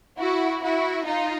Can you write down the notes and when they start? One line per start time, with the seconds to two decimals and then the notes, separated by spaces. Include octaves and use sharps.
0.18 E4 F#4
0.63 E4 F#4
1.05 D#4 F4